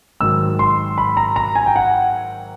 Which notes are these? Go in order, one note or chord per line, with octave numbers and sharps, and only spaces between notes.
G#2 D#3 F#3 E6
C6
B5
A#5
A#5
G#5
G5
F#5